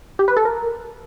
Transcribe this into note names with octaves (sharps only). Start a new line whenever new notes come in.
G4
B4
A4
A#4